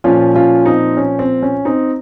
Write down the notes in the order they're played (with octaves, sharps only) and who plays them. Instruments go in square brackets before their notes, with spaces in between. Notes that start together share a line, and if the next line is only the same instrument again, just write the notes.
[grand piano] A#2 F3 C#4 F4
C#4 F4
C4 D#4
C#4
C4
C#4
C4 D#4